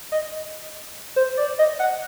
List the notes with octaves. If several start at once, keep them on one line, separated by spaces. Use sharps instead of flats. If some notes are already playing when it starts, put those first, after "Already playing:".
D#5
C5
D5
D#5
F#5